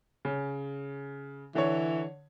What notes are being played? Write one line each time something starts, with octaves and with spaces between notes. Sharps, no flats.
C#3
D3 E3 C#5